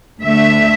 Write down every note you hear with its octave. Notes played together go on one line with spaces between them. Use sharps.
D2 D3 A3 E5